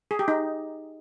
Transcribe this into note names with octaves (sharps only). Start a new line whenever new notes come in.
G#4
G4
D#4